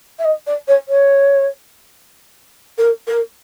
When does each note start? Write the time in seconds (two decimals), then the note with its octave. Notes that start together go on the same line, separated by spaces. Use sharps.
0.19 E5
0.24 D#5
0.47 D5
0.67 C#5
0.88 C#5
2.78 A#4
3.07 A#4